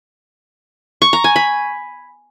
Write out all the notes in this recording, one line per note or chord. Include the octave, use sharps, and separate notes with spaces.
C#6
A#5
G#5
B5